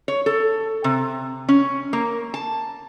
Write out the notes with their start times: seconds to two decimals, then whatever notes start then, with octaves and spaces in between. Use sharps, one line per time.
0.08 C#5
0.26 A4
0.84 C3
1.49 C#4
1.93 A#3
2.34 A5